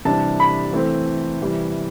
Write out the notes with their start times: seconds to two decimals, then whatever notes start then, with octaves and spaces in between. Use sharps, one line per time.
0.05 C3 E3 G3 D4 A5
0.40 B5
0.73 E3 A3 C4
1.41 C3 E3 G3